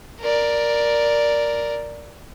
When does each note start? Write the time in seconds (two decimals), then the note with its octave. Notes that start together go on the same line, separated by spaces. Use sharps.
0.21 A#4 D5